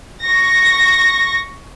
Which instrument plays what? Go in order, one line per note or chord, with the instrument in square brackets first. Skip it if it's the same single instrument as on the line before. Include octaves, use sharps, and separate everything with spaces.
[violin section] C#6 A#6